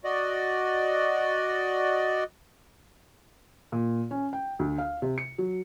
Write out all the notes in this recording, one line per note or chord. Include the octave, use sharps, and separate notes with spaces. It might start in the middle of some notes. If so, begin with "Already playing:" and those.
F#4 D5 D#5
A#2
C#4
G5
D2
F5
C3
C#7
F#3